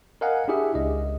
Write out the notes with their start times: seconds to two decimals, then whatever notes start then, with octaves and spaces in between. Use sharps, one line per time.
0.21 A#4 D#5 F5 F#5 G#5
0.48 D4 E4 G4 G#4 E5
0.75 C#2 D#5